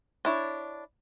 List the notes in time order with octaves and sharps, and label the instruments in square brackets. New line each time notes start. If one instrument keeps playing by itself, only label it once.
[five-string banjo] D4 E4 C#5